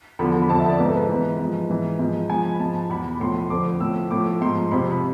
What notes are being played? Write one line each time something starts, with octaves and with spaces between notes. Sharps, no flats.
E2 D3 F3 B5
B5
F2 D3 F3 A5
E5
D5
G#2 F3 B4
A4
B4
G#2 E3
G#2 F3
G#2 E3
G#2 F3
G#2 F3 G#5
B5
G#2 F3 A5
E2 B2 B5
A2 F3 C6
F2 D3 F3 D6
A2 F3 E6
A2 F3 D6
G#2 F3 C6
F2 C3 F3 B5
B5